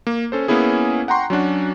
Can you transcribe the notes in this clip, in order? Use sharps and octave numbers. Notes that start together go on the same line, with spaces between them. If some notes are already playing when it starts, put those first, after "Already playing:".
A#3
C#4 A4 C5
A#3 B3 C#4 E4 G#4
F#5 G5 A#5 C6 C#6
F#3 C#4 D4 F#4